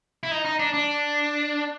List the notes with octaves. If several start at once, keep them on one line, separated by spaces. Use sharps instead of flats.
E4
D#4
D#4
D4
D4